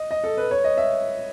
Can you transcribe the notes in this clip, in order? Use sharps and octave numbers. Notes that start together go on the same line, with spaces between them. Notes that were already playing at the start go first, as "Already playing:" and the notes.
Already playing: D#5
D#5
A4
B4
C#5
D#5
E5